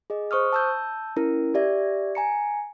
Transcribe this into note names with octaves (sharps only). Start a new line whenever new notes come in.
G#4 D#5
C5 C#6 D#6 F6
A5 E6 G6
C#4 E4 A#4
G4 D5 E5
G#5 A#5 C#7